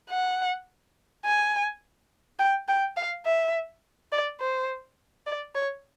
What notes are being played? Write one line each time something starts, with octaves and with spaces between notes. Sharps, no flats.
F#5
G#5
G5
G5
F5
E5
D5
C5
D5
C#5